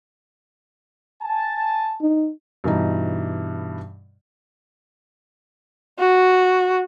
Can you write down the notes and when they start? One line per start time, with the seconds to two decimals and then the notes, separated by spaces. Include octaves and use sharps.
1.22 G#5 A5
2.01 D#4
2.64 G2 B2 E3 D#4
5.99 F#4